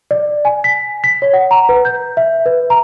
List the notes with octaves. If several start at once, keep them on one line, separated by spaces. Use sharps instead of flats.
D5
G#5
B6
B6
C#5
F#5
A#5
B4
G6
E5
B4
A#5